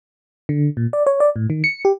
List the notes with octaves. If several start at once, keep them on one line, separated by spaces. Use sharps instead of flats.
D3
A#2
D5
C#5
D5
A2
D#3
C#7
G4